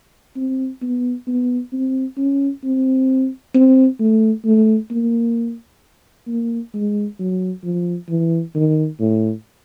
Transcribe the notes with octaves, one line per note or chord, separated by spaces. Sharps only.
C4
B3
B3
C4
C#4
C4
C4
A3
A3
A#3
A#3
G#3
F#3
F3
E3
D#3
A2